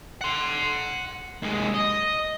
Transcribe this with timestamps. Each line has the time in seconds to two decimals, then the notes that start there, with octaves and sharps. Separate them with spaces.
0.21 F#5 C6
1.42 D#2 G#3
1.74 D#5